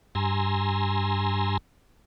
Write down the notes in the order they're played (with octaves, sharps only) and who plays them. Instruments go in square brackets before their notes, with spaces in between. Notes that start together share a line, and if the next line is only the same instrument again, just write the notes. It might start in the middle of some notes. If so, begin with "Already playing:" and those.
[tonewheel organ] G2 G#5 A#5 C6 E6